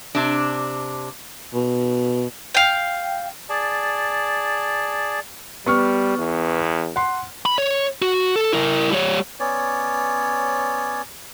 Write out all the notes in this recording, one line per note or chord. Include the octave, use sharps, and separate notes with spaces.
C3 D4
B2
F5 G5
G#4 D5 A5
G3 B3 C#6 F6
E2
F#5 C6
B5
C#5
F#4
A4
E4 A#4
G3 C#5
B3 C#4 C#5 D5